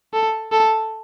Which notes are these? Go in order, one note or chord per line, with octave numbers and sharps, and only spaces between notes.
A4
A4